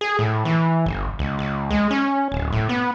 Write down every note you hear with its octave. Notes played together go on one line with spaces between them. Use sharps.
G#4
A2
E3
G1
C#2
C#2
G#3
C#4
D1
A2
B3